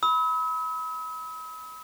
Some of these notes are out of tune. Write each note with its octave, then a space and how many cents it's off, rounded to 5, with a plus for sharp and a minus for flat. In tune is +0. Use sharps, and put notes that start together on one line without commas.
B5 +0 E6 -45